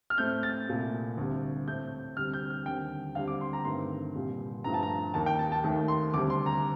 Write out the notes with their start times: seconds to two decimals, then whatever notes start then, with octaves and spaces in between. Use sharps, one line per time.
0.10 F6
0.18 A2 A3 C4 G6
0.43 A6
0.68 C2 A#2 A3
1.17 D2 C3 G3
1.67 A2 A3 C4 G6
2.17 D2 C3 G3 F6
2.34 G6
2.50 F6
2.66 D#2 D3 G3 C4 G5
3.15 D2 D3 G3 C4 F5
3.28 D6
3.41 C6
3.53 A#5
3.65 G2 D#3 A3 C4 C6
4.15 C2 A#2 G3
4.64 G2 F3 A3 A#5
4.74 A5
4.83 A#5
5.14 D#2 D#3 A#3 A5
5.26 G5
5.39 A5
5.52 A5
5.64 D#2 D#3 A3
5.88 C6
6.14 D2 C3 G3 C4 D6
6.30 C6
6.46 A#5